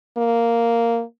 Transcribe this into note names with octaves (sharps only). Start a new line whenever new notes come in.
A#3